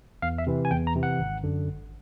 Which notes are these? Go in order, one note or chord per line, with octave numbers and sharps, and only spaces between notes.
E2 F5
E5
C3 E3
G#5
E2 G5
A#5
C3 E3
F#5
G#1
F#2 D3
G#1